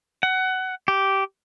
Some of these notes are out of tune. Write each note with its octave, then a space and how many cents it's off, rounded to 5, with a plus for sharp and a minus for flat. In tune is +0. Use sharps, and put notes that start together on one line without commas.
F#5 +20
G4 -10